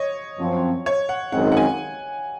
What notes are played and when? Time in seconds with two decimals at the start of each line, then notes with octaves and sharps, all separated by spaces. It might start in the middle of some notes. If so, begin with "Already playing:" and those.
Already playing: C#5 D#5
0.39 F#2 F3 C4
0.86 C#5
1.09 F#5
1.32 F#2 D#3 G#3 C4 D#4 F#5
1.52 F#5
1.57 G#5